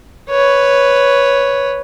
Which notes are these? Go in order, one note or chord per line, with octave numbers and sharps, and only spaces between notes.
B4 C#5